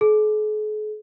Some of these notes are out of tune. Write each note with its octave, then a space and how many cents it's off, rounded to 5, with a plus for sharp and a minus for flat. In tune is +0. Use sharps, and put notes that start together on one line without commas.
G#4 +45